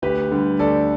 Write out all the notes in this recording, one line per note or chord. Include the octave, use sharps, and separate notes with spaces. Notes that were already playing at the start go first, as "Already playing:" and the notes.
D2 G4 B4
D3 G3
D2 A4 D5